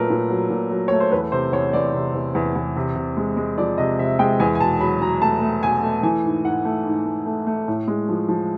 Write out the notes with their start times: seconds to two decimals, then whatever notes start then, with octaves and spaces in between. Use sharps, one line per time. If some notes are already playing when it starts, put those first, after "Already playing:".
Already playing: A#2 F#3 A3 A#4 B4
0.10 A#2
0.30 F#3
0.50 A#2
0.71 F#3
0.88 A3 C#5
1.00 C5
1.12 E2 B4
1.32 C3 C5
1.52 E2 C#5
1.73 E2 D5
1.94 C3
2.14 E2
2.35 E2
2.56 E2
2.76 C3
2.96 C3
3.17 G#3
3.37 G#3
3.58 F3 D5
3.78 C3 D#5
3.99 C3 E5
4.19 G#3 G5
4.40 E2 G#5
4.55 G#5
4.60 B2 A5
4.80 F#3 B5
5.01 F#3 A#5
5.21 A3 A5
5.42 A3
5.63 B2 G#5
5.83 A3
6.03 E3 G#5
6.25 G#2
6.44 G#2 F#5
6.65 A3
6.86 G#2
7.05 A3
7.26 A3
7.47 A3
7.68 A2
7.88 G#3
8.09 F3
8.29 F3